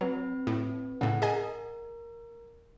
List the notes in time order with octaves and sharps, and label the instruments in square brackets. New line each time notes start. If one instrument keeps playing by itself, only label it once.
[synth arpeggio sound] F#3 [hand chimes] C4 B4
[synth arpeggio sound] A2
[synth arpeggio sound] A2 C#3 [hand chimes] F#5
[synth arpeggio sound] G#4 D#5 G#5 [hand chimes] A#4